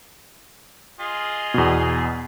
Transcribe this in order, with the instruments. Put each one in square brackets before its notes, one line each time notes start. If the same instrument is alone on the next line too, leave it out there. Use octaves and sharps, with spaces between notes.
[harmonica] F4 G#4 D#5
[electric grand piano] E2 B2